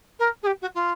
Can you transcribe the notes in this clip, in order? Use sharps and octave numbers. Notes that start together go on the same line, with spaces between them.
A#4
G#4
G4
F#4
F4